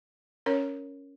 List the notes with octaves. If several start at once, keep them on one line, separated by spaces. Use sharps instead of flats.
C#4 A#4 C#5